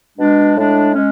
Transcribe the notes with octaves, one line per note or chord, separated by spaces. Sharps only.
B2 G#3 D4
A2 G#3 D4
G#3 C#4